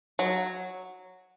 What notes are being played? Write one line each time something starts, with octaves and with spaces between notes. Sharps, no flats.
F#3